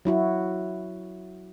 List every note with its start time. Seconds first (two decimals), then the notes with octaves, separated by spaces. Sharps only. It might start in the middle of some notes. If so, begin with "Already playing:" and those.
0.05 F#3 E4 F#4